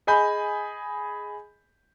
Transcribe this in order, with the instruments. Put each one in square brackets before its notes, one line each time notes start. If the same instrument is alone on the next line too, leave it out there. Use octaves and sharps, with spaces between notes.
[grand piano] G#4 D#5 G#5 B5 G6